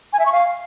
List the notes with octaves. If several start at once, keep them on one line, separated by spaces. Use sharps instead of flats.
G#5
E5
C#6
F5